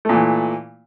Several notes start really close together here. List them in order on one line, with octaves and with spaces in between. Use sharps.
A3 A#2 E3